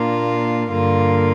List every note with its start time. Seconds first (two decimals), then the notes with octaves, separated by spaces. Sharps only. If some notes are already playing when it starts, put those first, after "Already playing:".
Already playing: A#2 A#3 D4 F4
0.70 G2 D3 A#3 F4